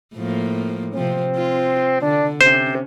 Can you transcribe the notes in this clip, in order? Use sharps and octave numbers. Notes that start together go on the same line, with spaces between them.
A2 F3 A#3
C3 F3 C4
F4
D3 D4
C3 C#4 C5